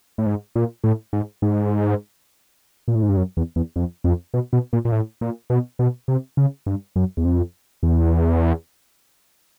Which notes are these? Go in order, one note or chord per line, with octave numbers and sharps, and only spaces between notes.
A2
G#2
A#2
A2
G#2
G#2
A#2
A2
G#2
G2
F#2
E2
E2
F2
F2
B2
B2
A#2
A#2
A2
A#2
B2
B2
C3
C#3
G2
F#2
E2
F2
E2